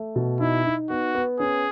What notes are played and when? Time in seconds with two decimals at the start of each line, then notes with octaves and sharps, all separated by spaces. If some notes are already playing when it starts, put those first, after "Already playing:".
Already playing: A3
0.16 B2
0.40 D#4 E4
0.65 D#4
0.89 B3 F#4
1.15 B3
1.39 C#4 G#4